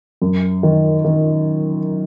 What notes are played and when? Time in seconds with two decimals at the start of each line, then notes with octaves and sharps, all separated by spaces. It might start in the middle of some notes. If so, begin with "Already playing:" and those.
0.22 F#2
0.63 D#3
1.04 D#3